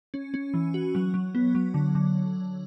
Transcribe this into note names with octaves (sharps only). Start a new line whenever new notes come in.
C#4
C#4
E3
F#4
F#3
F#3
B3
F#3
D3
D3